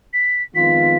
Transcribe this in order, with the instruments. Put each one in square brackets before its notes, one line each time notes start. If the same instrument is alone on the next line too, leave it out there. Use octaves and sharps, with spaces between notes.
[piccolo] B6
[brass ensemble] F2 D#3 G#3 B3 F4 [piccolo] B6